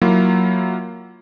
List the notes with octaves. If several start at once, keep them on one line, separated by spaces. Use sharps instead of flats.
F#3 A#3 E4 F4